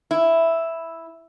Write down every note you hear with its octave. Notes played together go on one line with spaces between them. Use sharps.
E4